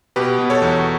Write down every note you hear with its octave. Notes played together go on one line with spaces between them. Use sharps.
B2 G4 B4
B2
A4 C#5
E2